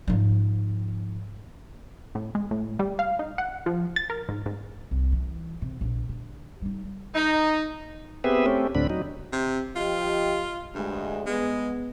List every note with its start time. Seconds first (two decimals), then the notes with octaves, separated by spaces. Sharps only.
0.08 G#2 F3
2.15 A2
2.35 G#3
2.51 A2
2.79 G3
2.99 F5
3.19 D#4
3.38 F#5
3.66 F3
3.96 A6
4.10 A#4
4.29 G#2
4.46 G#2
4.91 C2
5.12 E3
5.62 C3
5.81 A#1 D3
6.09 D3
6.61 G3 D#4
7.15 D#4
8.24 B3 C4 G4 G#4 B4 E5
8.46 A3 C4 C#4 G4
8.75 D2 A2 D3 C4 D4 B5
8.90 F#3 D#4
9.32 C3
9.76 F3 F4 G4 D#5
10.74 D2 G2 G#3
11.26 G#3 B3